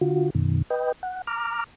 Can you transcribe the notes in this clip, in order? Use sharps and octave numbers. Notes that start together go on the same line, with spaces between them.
D3 F4 F#4
F#2 B2 D#3
B4 D#5 G5
F#5
A#5 D6 F6